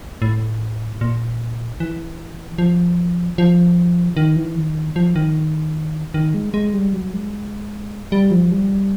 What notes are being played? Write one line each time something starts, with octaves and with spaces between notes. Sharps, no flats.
A2
A#2
E3
F3
F3
D#3
E3
D#3
F3
D#3
D#3
G#3
G#3
G3
F#3
G#3
G3
F3
G3